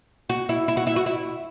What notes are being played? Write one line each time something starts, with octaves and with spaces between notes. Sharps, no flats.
F#4
E4
E4
F#4
E4
F#4
E4